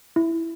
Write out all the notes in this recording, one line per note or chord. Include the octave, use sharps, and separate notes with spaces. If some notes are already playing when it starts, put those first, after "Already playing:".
E4